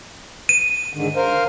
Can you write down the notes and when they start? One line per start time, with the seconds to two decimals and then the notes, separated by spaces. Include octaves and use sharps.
0.49 D#7
0.94 G#2 D3 D#3
1.16 A#4 C5 F5